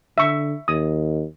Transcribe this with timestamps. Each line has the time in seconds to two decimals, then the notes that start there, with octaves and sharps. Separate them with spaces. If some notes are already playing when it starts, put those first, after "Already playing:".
0.18 D3 E5 C#6
0.68 D#2 D#6